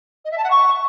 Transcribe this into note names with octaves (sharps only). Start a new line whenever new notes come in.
D#5
E5
A5
F#5
C#6